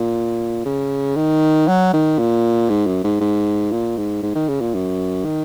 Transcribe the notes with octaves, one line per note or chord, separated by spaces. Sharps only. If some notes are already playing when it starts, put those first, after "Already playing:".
Already playing: A#2
C#3
D#3
F#3
D#3
A#2
G#2
F#2
G#2
G#2
A#2
G#2
G#2
D#3
C#3
A#2
F#2
D#3